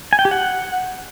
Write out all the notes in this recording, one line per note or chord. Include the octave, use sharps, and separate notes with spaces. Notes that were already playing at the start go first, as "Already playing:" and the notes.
G#5
G5
G4
F#5